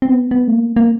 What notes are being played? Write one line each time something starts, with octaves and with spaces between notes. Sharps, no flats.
C4
B3
B3
A3
A#3
A#3